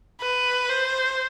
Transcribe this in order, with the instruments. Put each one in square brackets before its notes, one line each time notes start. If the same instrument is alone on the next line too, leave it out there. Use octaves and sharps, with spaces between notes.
[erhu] B4
C5